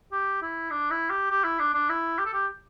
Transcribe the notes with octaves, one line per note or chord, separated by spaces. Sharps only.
G4
E4
D4
E4
G4
G4
E4
D4
D4
E4
G4
A4
G4